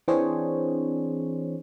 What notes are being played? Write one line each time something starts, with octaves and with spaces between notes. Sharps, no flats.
E3 C4 D4 G#4 C5 C#5